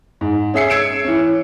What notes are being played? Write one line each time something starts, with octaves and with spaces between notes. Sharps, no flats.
G#2
C#4 G#4 E5 C7 C#7
E6 G#6 C#7 D7 E7
E3 C#4